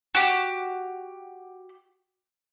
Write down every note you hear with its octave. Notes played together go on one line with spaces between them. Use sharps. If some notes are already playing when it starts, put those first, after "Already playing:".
F#4 G4